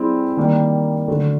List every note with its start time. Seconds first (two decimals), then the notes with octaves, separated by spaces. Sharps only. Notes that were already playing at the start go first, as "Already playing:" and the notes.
Already playing: G3 C4 E4 G#4
0.37 D#3 G3 A#3
1.08 D3 F#3 A3